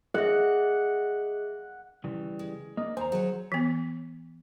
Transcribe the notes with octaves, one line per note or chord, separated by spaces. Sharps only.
G#4 D#5 E5 F#5
C#3 E3 G3
G#3
A#3 D4 D#5
D#2 A2 C5 G#5 A#5
F#3 G#4 C#5
E3 B3